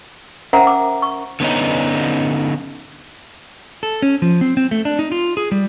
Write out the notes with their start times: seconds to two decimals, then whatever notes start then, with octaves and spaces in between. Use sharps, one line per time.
0.53 C#4 A#4 C5 E5 F#5 A#5
0.67 D6
1.02 C#6
1.40 D3 B3 C#4 D#4
3.83 A4
4.02 C#4
4.22 F3
4.41 C4
4.57 C4
4.71 A3
4.85 D4
4.99 D#4
5.12 F4
5.37 G#4
5.52 G3